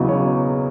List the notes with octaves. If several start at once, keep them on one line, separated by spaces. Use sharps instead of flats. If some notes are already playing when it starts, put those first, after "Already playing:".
Already playing: E2 C#3 F#3 B3 D#5
C#5